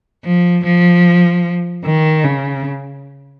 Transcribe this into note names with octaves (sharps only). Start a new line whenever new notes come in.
F3
F3
D#3
C#3